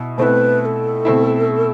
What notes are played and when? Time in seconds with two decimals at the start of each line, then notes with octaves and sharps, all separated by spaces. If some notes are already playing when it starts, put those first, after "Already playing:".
Already playing: B2 E4
0.18 B2 A3 C4 E4 B4 C5
0.61 B4
0.65 A4
1.05 B2 A3 C4 E4